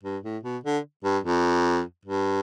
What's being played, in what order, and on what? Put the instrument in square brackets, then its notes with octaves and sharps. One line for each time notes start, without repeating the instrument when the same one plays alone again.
[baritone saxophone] G2
A2
B2
D3
G2
F2
G2